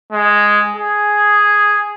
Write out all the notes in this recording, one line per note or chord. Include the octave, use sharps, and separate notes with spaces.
G#3
G#4